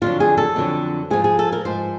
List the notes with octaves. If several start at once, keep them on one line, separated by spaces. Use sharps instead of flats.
F2 D3 F#3 F4
G#4
A4
F2 D3 F#3
G#2 F3 G#4
G#4
A4
A#4
G#2 F3 C5